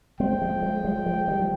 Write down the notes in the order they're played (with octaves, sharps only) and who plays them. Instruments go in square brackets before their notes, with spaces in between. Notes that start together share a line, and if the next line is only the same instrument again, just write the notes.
[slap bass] G#3 C4 [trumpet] G5
[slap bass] F3 G#3
F3 G#3
F3 G#3
F3 G#3
D#3 G3
F3